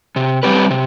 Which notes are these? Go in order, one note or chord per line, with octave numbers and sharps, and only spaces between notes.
C3
G3 C4 G4 B4
C3